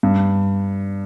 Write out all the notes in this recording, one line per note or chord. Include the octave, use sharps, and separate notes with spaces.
G2